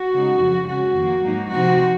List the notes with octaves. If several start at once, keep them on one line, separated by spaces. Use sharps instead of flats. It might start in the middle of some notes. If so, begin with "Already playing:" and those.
Already playing: F#4
C#3 G#3 D#4
F2 C#3 F#3
C#3 G#3 C#4 F#4
F2 D#3 A#3
G#2 F#3 A#3 D#4
C3 F3 C4 D#4 F#4